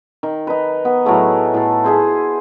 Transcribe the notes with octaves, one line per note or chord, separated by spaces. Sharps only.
D#3
D#4 B4
B3
A2 F#3 A3 G#4
A2 A4
E4 G#4 C5